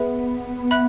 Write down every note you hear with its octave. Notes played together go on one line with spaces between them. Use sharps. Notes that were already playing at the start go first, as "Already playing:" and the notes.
Already playing: B3 G#4 B4 E5
E5 B5 F#6